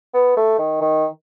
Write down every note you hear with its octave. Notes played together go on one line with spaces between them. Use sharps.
B3
A3
D#3
D#3